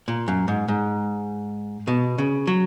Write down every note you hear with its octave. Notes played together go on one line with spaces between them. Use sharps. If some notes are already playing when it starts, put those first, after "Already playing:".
A#2
F#2
G#2
G#2
B2
C#3
F#3